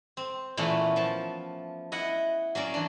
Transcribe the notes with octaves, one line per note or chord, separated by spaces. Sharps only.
C4
A#2 E3 A3 B3 C#4
F3 A5
E4 D#5 F#5
F#3 A#3 C#4 D5
E3 D4